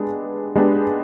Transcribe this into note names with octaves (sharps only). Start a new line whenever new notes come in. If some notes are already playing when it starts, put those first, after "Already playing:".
Already playing: G#3 B3 D4 G4
G#3 B3 D4 G4